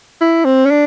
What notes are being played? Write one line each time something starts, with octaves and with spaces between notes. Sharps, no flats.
E4
C4
C#4
D4